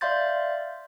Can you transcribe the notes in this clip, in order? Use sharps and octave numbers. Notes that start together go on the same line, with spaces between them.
D5 E5 F5 C6 G6 A6